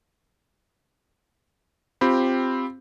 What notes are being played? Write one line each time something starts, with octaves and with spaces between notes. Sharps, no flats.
C4 F4 G4 B5